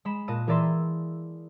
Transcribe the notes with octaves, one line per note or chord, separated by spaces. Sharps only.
G#3 B5 E7
A#2 D#5 A5 F#6 D#7
E3 G#4 A#4 D5 E5 C6